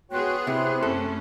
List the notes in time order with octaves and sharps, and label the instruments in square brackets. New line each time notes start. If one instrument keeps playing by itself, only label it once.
[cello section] B3 G#4 [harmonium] F#4 C#5 G5 [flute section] C6 F#6
[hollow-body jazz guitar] C3 [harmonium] C4 E4
[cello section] F#2 A3 C#4 [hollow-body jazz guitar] A4